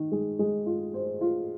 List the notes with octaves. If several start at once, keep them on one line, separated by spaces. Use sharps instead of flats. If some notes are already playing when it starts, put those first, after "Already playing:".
Already playing: D#3
G#3
G#3
F4
C5
F4